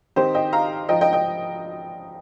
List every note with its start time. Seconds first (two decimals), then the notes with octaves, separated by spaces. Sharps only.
0.16 D#3 C4 D#4 G4 C5
0.34 D#5 G5
0.53 F5 A#5
0.89 F3 D#4 D#5 G5
1.01 D#5 G5
1.13 D#5 G5